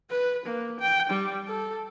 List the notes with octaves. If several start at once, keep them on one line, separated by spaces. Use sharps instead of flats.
B4
A#3
G5
G3
A4